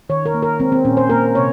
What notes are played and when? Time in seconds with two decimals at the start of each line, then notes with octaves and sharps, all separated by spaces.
0.09 D#3 C#5
0.26 A#4
0.34 A#3
0.43 A#4
0.60 G#3 C4
0.72 C4
0.85 A#2 C#4
0.97 C5
1.10 A#3 A#4
1.35 C3 C#5